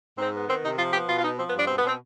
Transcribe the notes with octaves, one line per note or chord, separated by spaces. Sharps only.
G#2 C4
B3
D#3 C4
C3 D#4
F3 F4
B3 G4
B2 F4
F4
B3 D#4
F3 C4
B3
G2 D4
B2 C4
B3
B2 C4